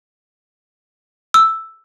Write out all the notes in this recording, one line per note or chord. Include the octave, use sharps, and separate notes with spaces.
E6